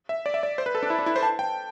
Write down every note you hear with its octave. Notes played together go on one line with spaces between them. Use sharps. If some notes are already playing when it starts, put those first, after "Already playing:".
E5
D5
E5
D5
C5
B4
A4
D4
E4
D4
E4
C5
A5
G5